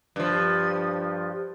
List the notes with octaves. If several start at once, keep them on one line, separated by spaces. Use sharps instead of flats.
G2 F3